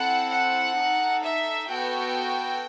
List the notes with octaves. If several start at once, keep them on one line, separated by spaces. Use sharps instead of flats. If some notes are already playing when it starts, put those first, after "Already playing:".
Already playing: C4 E4 A4 F#5
F#5
D#4 A4
E5
B3 F#4 A4 G5